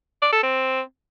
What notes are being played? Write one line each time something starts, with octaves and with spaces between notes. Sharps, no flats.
D5
A4
C4